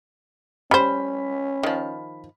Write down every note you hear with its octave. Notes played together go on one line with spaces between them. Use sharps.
G3 C#4 C5 B5
D#3 F3